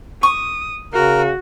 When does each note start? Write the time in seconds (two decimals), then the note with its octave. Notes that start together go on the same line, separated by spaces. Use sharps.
0.23 C#6 D#6
0.93 C#3 F#4 A#4